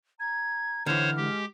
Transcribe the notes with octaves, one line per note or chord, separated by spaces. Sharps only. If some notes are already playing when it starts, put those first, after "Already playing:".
A#5 G#6
D3 E3 C5 C#5 F6
G#3 G4